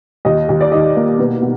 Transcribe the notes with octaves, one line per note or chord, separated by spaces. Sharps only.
D#2 D#5
D#2
D5
D#3 D#5
A#3
B2 B4
B2